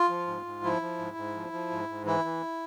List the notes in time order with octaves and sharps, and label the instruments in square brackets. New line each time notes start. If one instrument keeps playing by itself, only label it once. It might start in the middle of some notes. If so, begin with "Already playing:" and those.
Already playing: [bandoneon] F4
F3
G#2
G#2
F3 E4
F3
G#2
G#2
F3
F3
G#2
G#2
E3 E4
E3